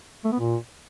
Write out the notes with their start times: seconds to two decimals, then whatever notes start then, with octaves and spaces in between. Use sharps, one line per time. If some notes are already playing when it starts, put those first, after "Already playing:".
0.25 A3
0.32 B3
0.40 A#2